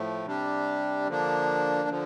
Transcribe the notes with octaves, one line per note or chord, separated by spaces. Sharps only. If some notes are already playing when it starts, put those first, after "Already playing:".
Already playing: A2 F3 A3
C3 G3 D4 G4
D3 F3 A#3 D4
D3 F3